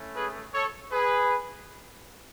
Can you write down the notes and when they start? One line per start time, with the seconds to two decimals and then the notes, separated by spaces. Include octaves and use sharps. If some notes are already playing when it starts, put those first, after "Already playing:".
Already playing: A3 C#4 E4
0.16 G#4 B4
0.54 A4 C#5
0.92 G#4 B4